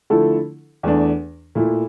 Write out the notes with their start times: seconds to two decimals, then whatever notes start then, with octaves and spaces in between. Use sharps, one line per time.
0.10 D3 F3 A3 E4 A4
0.83 E2 E3 A3 D4
1.55 A#2 A3 E4